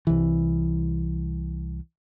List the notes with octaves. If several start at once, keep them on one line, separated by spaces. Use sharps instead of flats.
C2 E3